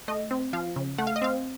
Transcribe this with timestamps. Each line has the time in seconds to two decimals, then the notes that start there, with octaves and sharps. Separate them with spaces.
0.08 A3 D#5
0.31 C4
0.53 F3 F5
0.76 C#3
0.98 A3 F#5
1.07 F5
1.16 D#5
1.22 C4 F5